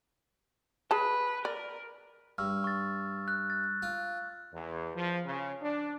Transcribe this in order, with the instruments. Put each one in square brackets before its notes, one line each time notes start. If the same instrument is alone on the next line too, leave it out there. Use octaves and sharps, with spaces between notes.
[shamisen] G#4 A5 [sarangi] B4
[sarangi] A#4 [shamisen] D5
[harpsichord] G2 [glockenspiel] C#6 E6 F6
[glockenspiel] C#6 A6
F#6
A6
[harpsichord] F4
[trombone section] E2
F3
C#3
D4